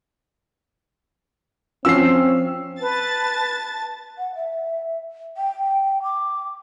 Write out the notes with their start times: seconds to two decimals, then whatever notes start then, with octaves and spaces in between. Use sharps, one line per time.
1.85 F3 C4 C#4 F4 E6 C7
2.80 B4 A5 A6
4.18 F#5
4.35 E5
5.37 G5
6.03 D6